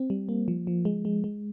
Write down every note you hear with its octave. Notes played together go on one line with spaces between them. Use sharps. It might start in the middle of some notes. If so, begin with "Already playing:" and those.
Already playing: C4
G3
A#3
F3
F3
G#3
G#3
G#3